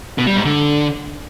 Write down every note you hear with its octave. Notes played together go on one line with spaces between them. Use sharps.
B2
G3
G#2
D3